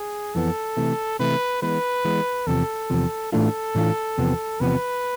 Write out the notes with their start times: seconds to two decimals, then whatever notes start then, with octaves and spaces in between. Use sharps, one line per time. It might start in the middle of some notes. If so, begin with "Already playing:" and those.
Already playing: G#4
0.34 F2 E3 B3 A4
0.77 C3 E3 A3
1.19 C3 E3 A3 B4
1.62 E3 G#3 B3 B4
2.05 E3 G#3 B3
2.47 E2 C3 F3 A4
2.90 E2 C3 F3
3.32 A2 E3 A3 D4 F4 A4
3.75 A2 E3 A3 D4 F4
4.18 E2 C3 F3 B3
4.60 E2 C3 F3 B3 B4